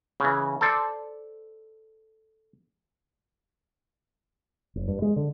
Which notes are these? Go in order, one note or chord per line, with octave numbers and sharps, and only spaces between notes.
C#3 E3
A4 C5 D5
F#1
G2
G#3
D3